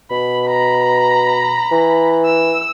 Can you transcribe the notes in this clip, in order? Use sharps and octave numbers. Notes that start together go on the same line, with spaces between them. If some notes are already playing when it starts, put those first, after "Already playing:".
B2 B5
A#5 B5
E3
E6